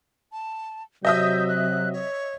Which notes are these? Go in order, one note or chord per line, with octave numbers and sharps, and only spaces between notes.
A5
C3 F#3 D#5 E5 D#6 G6
F#6
C#5